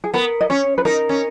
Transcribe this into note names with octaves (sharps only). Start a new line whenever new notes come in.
G#4
B3 A#4
D#5
C#4 C#5
B4
D#4 A#4
C#4